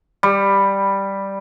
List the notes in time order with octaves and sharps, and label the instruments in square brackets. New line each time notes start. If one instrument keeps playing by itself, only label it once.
[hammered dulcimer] G3